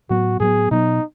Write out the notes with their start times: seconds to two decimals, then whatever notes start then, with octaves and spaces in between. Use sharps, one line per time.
0.10 A2 F#3 B3 F#4
0.40 A2 F#3 B3 G#4
0.71 B2 F#3 B3 D#4